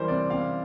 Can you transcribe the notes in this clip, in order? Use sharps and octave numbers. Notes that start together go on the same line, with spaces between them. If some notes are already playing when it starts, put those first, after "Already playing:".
Already playing: E3 G3 A#4 C5
C3 D5
C3 F5